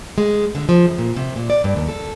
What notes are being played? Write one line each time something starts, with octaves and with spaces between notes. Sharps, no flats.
G#3
D3
F3
F#2
A#2
C3
A#2
D5
G2
D#2
A4